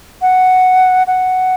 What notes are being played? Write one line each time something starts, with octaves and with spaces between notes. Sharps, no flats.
F#5
F#5